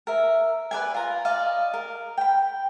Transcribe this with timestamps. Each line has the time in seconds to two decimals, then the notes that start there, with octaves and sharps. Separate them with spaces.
0.07 A#4 E5
0.71 B4 D5 G#5
0.94 F4 A#5
1.25 D5 D#5 F5
1.74 A#4
2.18 G5 B5